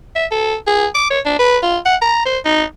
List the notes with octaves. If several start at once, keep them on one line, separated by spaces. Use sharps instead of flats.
E5
A4
G#4
D6
C#5
D4
B4
F4
F#5
A#5
C5
D#4